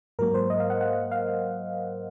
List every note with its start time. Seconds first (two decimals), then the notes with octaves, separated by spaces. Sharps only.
0.19 G#2 F#3 A#3 A#4
0.34 C5
0.50 D#5
0.60 F5
0.70 F#5
0.81 F#5
1.12 F5